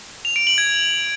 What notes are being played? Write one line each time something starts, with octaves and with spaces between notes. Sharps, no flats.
F7
D7
F#7
G#6